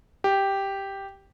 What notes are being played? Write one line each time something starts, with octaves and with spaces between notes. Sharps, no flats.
G4